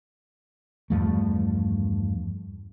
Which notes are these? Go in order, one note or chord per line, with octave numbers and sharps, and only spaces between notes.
E2 G2 F3 A3